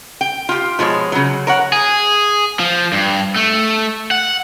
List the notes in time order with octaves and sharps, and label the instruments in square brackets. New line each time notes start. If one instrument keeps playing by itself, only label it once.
[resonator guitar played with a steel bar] G5
F4 G4
B2 F3 G#3 C#5
C#3 F#3
A#4 C#5 F#5
[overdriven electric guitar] G#4
F3
G2
A3
F#5